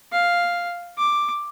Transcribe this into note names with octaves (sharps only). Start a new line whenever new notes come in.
F5
D6